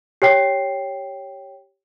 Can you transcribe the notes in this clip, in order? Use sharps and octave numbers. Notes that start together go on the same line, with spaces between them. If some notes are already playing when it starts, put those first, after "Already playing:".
G4 C#5 G5 C7